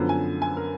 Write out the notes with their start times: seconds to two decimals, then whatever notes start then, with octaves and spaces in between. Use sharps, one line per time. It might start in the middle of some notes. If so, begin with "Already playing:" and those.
Already playing: F#2 D3 F3 B3
0.09 G#5
0.42 G#5
0.57 A#4